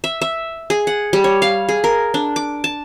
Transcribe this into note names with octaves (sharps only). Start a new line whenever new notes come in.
E5
E5
G#4
F#5
G3
C#5
F5
G#4
A#4
D4
D6
A5